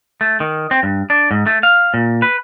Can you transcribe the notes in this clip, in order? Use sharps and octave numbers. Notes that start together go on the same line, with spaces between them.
A3
D#3
C4
G2
D4
G#2
A3
F5
A#2
B4